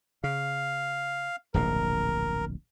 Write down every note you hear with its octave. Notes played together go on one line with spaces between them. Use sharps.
C#3 F5
D1 A#1 B2 A#4